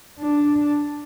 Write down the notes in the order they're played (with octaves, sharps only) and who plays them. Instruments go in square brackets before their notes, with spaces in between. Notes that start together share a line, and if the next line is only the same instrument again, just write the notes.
[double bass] D4